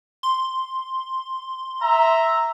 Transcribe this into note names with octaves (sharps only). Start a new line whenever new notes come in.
C6
E5 A#5